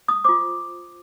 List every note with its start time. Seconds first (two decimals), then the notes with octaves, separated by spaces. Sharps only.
0.08 D#6
0.24 F4 C5 D6